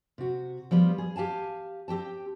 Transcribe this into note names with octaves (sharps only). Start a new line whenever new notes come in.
C3 F#4
F3 G3 B3 F4
G#4
G4 F5 G#5 A5
C4 G4 G5 A5